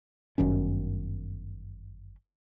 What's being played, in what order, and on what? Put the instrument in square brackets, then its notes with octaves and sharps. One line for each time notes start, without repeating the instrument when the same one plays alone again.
[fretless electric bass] G1 F#2 D#3 C#4